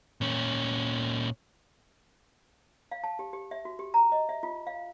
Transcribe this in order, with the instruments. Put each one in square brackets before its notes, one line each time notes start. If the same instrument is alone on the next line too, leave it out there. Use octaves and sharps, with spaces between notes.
[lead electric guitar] A#2 C#4
[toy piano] F5
A5
G4
G4
E5
F#4
G4
A#5
D#5
E5
F4
F5